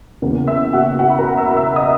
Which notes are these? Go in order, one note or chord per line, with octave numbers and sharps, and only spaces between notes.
E2 C#3 E3 A#3
E5 E6
F#4 F#5
F#4 F#5
B5
A#4 A#5
E5 E6
E5 E6
D#5 D#6